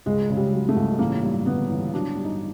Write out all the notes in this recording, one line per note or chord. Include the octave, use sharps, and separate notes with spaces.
C#2 G#3
C#3
G3
F#3
A3
C#2
A1 A#3
G2
D3 B3
A1
F#3 D4
G2
D#4